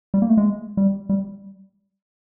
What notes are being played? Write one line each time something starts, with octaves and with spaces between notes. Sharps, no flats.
G3
A#3
A3
G#3
G3
G3